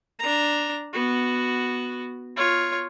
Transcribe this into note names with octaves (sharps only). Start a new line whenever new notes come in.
D4 A#5
B3 F#4
F4 C#5